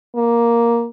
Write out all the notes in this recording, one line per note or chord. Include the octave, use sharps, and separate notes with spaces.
A#3